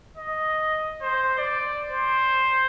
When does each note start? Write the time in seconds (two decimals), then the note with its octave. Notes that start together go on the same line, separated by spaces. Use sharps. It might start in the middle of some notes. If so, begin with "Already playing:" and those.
0.17 D#5
1.02 C5
1.38 D5
1.90 C5